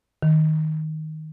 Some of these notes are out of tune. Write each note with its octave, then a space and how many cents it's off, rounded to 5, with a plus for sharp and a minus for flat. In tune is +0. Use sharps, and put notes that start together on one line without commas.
D#3 +5